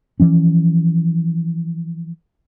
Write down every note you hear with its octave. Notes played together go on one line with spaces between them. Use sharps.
E3 F3 C#4